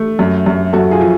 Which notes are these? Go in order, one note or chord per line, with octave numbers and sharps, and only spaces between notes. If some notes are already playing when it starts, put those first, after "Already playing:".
Already playing: A3
F#2
F#2
F#2 F#4 A4
F4 G#4
F3